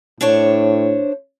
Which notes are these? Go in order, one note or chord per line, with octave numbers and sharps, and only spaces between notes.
A2 D4 C5 C#5